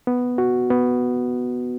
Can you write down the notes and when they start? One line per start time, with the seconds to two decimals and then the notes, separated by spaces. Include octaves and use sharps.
0.07 B3
0.38 F#4
0.70 B3